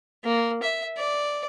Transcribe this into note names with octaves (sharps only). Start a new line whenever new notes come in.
A#3
E5
D5